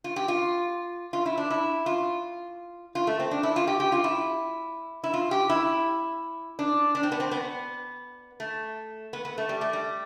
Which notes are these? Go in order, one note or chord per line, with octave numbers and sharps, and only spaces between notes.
F4
G4
F4
F4
E4
D4
E4
F4
F4
A3
C4
D4
E4
F4
G4
G4
F4
E4
E4
F4
G4
E4
D4
D4
C4
B3
C4
B3
A3
B3
B3
A3
G3
A3
G3